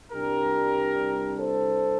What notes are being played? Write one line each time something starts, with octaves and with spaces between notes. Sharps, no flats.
C2 C3 G3 D4 G4 A#4
A4 C5